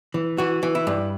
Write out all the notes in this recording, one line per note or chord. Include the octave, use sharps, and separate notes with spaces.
E3
E3 F#4
E3
E4
G2